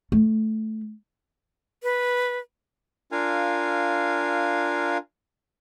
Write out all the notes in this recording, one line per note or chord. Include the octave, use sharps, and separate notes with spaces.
A3
B4
D4 F4 A#4 F5 G#5